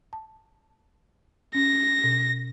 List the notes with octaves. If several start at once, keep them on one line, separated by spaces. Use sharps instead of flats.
A5
C#4 A#6
B2